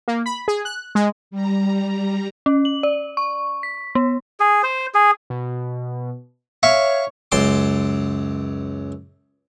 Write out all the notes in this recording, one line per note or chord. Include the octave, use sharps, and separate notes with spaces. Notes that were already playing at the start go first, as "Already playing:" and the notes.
A#3
B5
G#4
F#6
G#3
G3 A#5
C#4
F#7
D5
C#6
B6
B3
G#4
C5
G#4
B2
C#5 E5 F5 C#6
C#2 F#2 A5 C6 D6